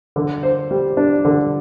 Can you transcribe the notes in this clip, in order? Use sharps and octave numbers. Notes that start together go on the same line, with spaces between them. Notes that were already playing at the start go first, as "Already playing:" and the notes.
D3
C5
G3
D4
D3